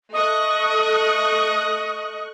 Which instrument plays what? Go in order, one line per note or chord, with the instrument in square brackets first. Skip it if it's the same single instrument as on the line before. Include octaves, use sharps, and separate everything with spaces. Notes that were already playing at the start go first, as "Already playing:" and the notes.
[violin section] A3 C#6 F#6 [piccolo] D#5